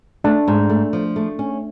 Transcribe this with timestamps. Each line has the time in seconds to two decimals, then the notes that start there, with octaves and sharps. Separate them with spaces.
0.24 A3 D4
0.48 G#2
0.70 A3
0.93 F3
1.16 A3
1.39 C#4